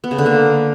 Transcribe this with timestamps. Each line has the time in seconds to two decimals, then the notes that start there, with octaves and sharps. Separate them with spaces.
0.04 B3
0.11 C#3
0.18 D3
0.26 A#3